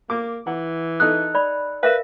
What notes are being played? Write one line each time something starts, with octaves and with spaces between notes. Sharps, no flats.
A#3 D6
E3 F#5
D#4 A4 D#6 F#6
D5 B5
A#4 B4 E5 F5